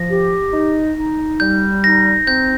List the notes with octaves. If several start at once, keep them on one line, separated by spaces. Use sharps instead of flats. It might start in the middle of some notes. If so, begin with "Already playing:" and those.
Already playing: F3 A#6
G4
D#4
D#4
G3 G6
D#4 A#6
C4 G6